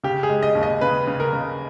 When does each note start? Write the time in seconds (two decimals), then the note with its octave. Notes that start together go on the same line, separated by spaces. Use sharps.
0.03 C#3 G4
0.23 G#4
0.29 G#3
0.42 D#5
0.55 D#2
0.63 D#5
0.81 C#3 B4
1.07 C#3
1.20 A#4
1.33 C#3